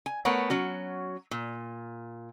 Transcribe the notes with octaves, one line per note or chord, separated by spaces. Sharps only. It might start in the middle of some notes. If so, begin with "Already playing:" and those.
G#5
A3 B3 A#4 C#5 F#5
F#3 C#4 F#4
A#2